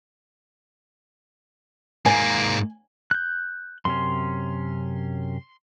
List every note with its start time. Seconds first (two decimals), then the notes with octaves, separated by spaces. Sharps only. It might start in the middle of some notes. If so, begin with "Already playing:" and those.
2.06 G#2 A#3 G#5
3.11 F#6 G6
3.85 F#2 C3 C#4 C6